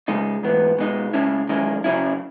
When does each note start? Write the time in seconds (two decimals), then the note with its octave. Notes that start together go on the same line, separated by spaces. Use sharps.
0.08 C#2 C#3 G#3 D#4
0.43 G#2 E3 B3
0.79 B2 G#3 D#4
1.13 C#3 G#3 C#4 E4
1.49 F#2 D#3 G#3 C#4 E4
1.84 C#3 F#3 C#4 E4